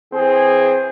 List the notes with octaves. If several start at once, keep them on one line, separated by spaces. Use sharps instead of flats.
E3 C4 G#4